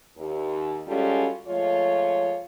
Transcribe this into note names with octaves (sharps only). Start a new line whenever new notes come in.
D#2
G3 G#3 C#4 F4 F#4 A4
F3 G#3 A3 F4 C#5